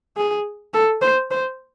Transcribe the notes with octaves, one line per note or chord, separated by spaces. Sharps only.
G#4
A4
C5
C5